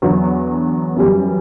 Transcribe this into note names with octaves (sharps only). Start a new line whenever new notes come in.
E2 D3 F#3 B3
F#2 E3 G3